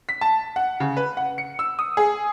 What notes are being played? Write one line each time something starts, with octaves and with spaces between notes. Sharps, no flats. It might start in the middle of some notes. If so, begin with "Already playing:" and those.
B6
A5
F#5
C#3
B4
F#5
C#7
E6
D#6
G#4